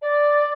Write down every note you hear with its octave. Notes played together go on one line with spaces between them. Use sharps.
D5